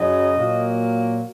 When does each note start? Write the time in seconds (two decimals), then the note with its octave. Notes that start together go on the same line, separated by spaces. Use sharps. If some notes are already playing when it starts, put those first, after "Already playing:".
Already playing: F#2 C#3 F#3 D#5
0.35 A#2 F#3 A#3